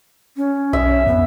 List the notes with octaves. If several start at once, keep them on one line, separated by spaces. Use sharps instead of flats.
C#4
B1 E5
F2 B3